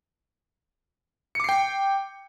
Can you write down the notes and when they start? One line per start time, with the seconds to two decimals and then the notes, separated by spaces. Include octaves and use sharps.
1.35 C#7
1.40 D6
1.44 C7
1.49 G5